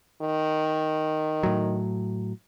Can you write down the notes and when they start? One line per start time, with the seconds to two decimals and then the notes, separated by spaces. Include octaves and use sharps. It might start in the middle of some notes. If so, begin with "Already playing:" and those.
0.21 D#3
1.43 A2 F#3